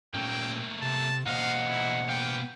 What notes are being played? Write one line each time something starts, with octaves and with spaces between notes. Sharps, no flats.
A#2 A3 A#3 C#4 G5
C3 A5
B2 A#3 D#4 F4 C5 F5 F#5
E4
B3 F5 G5